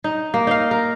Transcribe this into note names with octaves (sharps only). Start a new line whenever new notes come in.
D#4
A#3
D#4 D#5 F5
A#4